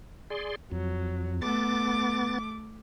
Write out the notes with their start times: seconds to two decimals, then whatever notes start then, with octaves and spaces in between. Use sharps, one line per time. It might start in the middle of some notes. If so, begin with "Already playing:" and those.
0.30 G#4 D5 C6
0.71 F2 F#3
1.42 A3 B3 D6 A6